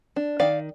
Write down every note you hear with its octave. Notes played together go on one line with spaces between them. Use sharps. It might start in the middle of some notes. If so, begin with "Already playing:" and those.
D4
D#3 D5 F5